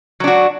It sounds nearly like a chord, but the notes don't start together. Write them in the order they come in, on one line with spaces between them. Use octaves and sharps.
F#3 D4 F#4